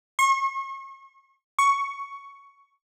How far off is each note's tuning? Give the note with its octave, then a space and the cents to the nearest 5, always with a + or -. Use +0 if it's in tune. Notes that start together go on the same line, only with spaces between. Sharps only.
C#6 -40
C#6 +5